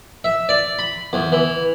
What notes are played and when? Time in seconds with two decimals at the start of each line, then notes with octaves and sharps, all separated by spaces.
0.24 E5
0.49 D5
0.79 B5
1.13 E2
1.32 E3